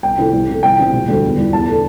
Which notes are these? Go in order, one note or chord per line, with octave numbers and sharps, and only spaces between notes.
C2 G5
C3 E3 A3
C2
C3 A3
C2 G5
C3 E3 G3
E1
D2 D3 G3
E2
E3 G3
E2 A5
D3 A3